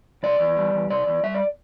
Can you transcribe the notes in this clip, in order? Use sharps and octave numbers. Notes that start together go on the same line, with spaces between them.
C3 D5
E2
G3
E2
C3 D5
E2
G3 E5
D5